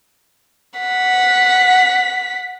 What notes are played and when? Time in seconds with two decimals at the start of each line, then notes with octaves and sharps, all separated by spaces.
0.79 F#5 B6